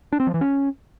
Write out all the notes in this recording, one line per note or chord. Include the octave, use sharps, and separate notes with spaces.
D4
C4
F3
E3
C#4